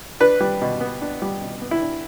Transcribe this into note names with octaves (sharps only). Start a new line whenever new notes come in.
D4 B4
G3
B2
B3
D4
G3
B2
B3
E4
D4